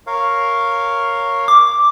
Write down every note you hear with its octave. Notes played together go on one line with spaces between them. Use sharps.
A#4 C#5 F5
D6